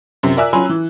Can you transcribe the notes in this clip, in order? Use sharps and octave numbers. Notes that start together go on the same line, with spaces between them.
F#2 C3
A#4 D5 E5 G#5 E6 F#6
F#3 C#4 G#5 B5 C6
E3